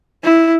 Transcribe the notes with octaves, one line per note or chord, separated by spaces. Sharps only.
E4